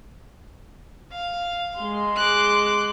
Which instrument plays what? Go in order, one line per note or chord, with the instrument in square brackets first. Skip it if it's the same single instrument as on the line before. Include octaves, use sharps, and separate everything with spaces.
[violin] F5
[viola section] G#3 C6
[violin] D6 F#6